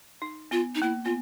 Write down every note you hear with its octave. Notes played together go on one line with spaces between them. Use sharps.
D#4
B3 F4
D#4
A#3 E4
B3 F4